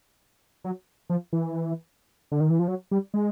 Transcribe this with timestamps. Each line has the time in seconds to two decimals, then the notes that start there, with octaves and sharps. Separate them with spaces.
0.64 F#3
1.09 F3
1.33 E3
2.32 D3
2.40 D#3
2.50 E3
2.59 F3
2.68 F#3
2.91 G3
3.14 G#3